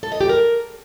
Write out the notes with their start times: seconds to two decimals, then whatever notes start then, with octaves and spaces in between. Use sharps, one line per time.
0.03 A4
0.12 D#5
0.21 G4
0.29 A#4